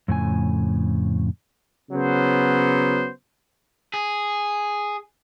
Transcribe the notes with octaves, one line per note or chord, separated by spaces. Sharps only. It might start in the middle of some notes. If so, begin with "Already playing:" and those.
F2 A2 C#3 G#5
C#3 F#3 B3 C5
G#4